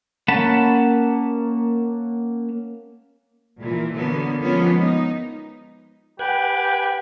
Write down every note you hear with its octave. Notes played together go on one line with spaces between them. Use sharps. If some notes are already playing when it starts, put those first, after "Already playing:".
A#3 C#4 F#5 A5 B5
A#2 E3
D3 F#3 A#3 B3
F3 G#3 A#3 B3 C#4 F4
D#4
G4 B4 F#5 G#5